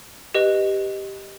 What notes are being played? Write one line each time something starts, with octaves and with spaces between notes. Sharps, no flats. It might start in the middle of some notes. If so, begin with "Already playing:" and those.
G4 B4 D#5